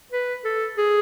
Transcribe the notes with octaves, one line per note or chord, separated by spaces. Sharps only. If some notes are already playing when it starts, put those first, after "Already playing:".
B4
A4
G#4